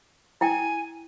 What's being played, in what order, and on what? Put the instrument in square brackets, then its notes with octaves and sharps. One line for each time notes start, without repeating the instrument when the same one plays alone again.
[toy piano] E4 G5 [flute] G#5